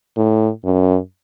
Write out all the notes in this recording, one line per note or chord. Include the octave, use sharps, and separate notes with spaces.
A2
F#2